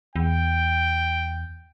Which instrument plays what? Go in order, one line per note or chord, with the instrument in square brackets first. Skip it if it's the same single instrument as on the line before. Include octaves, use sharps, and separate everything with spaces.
[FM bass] E2 [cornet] G5